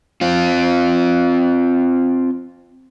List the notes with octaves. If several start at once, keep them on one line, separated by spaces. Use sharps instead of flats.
C4 F4